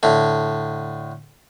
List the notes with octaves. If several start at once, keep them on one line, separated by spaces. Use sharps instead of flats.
A2 D3